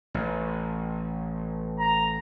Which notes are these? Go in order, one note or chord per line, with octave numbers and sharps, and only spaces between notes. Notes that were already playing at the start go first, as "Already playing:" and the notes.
A1
A#5